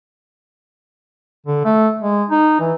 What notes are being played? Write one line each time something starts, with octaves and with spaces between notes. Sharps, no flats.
D3
A3
G#3
D#4
E3